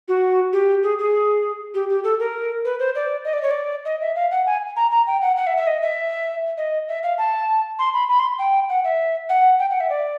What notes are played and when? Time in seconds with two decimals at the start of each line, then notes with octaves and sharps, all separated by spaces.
0.08 F#4
0.53 G4
0.83 G#4
0.99 G#4
1.74 G4
1.89 G4
2.04 A4
2.19 A#4
2.65 B4
2.79 C5
2.95 D5
3.25 D#5
3.33 D5
3.42 C#5
3.51 D5
3.85 D#5
4.01 E5
4.16 F5
4.31 F#5
4.46 G#5
4.76 A#5
4.91 A#5
5.07 G5
5.22 F#5
5.37 F#5
5.47 E5
5.57 E5
5.67 D#5
5.82 E5
6.57 D#5
6.88 E5
7.03 F5
7.18 A5
7.79 C6
7.93 B5
8.09 B5
8.19 C6
8.39 G5
8.69 F#5
8.84 E5
9.29 F#5
9.59 G5
9.70 F#5
9.80 E5
9.90 D5